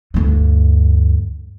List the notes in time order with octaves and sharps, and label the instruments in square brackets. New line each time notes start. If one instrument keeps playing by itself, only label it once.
[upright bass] D2 G2